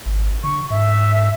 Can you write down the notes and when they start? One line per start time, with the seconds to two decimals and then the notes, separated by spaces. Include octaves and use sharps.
0.06 G#1
0.43 D3 C#6
0.70 G#2 E5